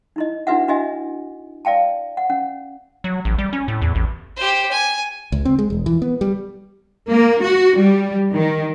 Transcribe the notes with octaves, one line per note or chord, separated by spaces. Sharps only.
D#4 E4 D#5
D4 E4 F#4 B4 E5 F#5
D4 E4 F#4 D#5 E5 G#5
D5 F5 G5 A5
F#5
C#4 F#5
F#3
A1
G3
C#4
A2
E2
A1
G4 C5
G#5
C#2
C4
G#3
E1
E3
B3
G3
A#3
F#4
G3
D#3